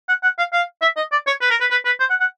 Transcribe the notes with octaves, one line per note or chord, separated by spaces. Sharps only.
F#5
F#5
F5
F5
E5
D#5
D5
C#5
B4
A#4
B4
B4
B4
C5
F#5
F#5